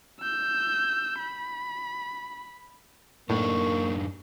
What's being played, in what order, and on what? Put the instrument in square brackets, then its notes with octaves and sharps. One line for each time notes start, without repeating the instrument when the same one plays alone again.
[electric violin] E6 G6
B5
[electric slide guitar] F#2 D4 D#4 [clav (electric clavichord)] A2 [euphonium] A#3 [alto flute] C#6